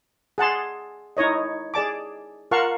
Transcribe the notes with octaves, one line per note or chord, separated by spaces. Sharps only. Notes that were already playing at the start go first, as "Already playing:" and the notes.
G#4 F#5 A5 C6
D#4 E4 C#5 D#5
G#4 D5 A5 D6
F4 A#4 F5 F#5 A5 C#6